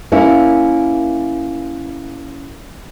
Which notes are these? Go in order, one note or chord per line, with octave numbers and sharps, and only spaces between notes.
A#3 C#4 E4